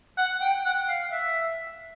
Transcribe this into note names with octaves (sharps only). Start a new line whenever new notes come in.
F#5
G5
F#5
F5
E5